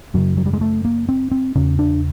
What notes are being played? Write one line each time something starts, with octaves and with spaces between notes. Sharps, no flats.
F#2 C#3 F#3
F#3
G3
G#3
A3
A#3
C4
C4
E2 C#3 C#4
D4